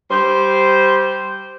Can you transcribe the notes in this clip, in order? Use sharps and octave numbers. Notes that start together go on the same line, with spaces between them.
G3 C5